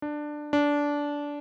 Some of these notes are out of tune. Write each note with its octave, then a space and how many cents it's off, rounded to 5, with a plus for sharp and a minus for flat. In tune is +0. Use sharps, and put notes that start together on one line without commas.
D4 +15
D4 -15